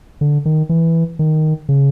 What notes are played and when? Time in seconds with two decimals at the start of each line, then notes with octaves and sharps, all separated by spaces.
0.21 D3
0.45 D#3
0.69 E3
1.19 D#3
1.69 C#3